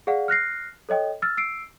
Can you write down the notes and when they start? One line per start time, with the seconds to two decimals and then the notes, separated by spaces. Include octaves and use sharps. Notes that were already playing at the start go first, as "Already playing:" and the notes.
0.07 G#4 D5 F5 F#5
0.28 F6 F#6 A#6 C7
0.89 A4 C#5 D#5 G5
1.22 E6 F6 A6
1.37 E6 C7 D7